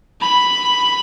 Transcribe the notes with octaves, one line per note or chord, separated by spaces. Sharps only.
B5